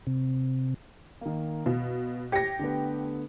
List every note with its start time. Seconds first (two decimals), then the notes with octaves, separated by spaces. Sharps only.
0.07 C3
1.21 D#3 A#3
1.66 B2 F5
2.32 G4 G#6 A#6 C#7
2.59 D3 A3 B3